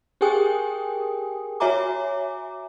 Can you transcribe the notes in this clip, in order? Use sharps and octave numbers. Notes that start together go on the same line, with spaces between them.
G4 G#4 A#4 G5 G#5 D#6
F#4 C#5 E5 G#5 A#5 D6